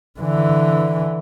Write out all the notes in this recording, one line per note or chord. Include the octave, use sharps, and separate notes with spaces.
D3 E3